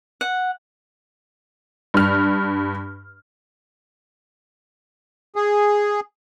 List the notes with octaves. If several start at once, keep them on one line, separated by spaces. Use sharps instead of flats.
F#5
G2 F6
G#4